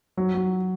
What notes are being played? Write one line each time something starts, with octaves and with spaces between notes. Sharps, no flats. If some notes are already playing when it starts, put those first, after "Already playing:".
F#3
F#3